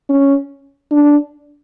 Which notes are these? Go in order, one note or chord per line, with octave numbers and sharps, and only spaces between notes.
C#4
D4